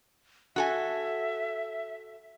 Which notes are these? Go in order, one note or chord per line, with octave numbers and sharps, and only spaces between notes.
F#4 A4 E5 G#5